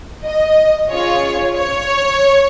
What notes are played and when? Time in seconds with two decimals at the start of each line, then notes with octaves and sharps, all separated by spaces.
0.24 D#5
0.91 C#4 F4 G#4 C#5
1.57 C#5